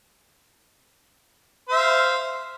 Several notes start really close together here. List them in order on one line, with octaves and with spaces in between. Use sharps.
C5 E5 F5